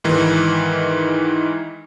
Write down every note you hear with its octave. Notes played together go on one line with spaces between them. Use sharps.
G#2 D#3 E3